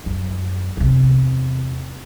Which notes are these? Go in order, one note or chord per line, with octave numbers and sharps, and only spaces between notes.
F#2
E2 C3